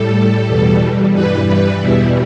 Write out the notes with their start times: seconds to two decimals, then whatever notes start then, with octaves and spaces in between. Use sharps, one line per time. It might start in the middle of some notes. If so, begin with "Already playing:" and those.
Already playing: A2 G3 A4
0.47 E2 B2 G3
1.14 G2 E3 G3 B4
1.47 B4
1.80 E2 B2 G3 E4